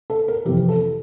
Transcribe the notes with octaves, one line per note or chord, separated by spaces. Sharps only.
A4
A#4
F2 C3 E3 G4
A4